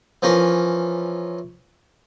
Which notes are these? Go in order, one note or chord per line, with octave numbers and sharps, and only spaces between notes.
E3 F3 C#4 A#4